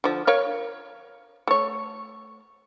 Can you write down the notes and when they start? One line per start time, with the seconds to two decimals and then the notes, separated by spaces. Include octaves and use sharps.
0.04 D3 F3
0.27 A#4 C#5 F5
1.47 A3 C#5